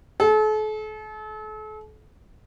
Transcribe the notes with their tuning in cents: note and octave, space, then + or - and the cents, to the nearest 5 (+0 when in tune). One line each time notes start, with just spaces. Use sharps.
A4 -40